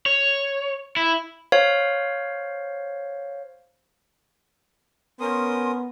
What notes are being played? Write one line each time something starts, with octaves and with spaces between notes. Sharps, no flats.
C#5
E4
C5 C#5 F5
B3 C#4 A#4 C6 D#6